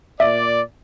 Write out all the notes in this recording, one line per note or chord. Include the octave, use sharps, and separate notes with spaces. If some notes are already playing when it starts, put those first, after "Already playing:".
A#2 D5 E5